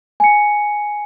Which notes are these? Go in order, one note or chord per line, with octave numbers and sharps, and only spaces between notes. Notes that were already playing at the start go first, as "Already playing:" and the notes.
G#5 C#7